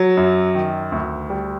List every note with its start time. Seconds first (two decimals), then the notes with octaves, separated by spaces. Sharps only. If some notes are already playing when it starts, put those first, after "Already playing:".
Already playing: F#3
0.17 F#2
0.55 D#3
0.92 D2
1.30 G3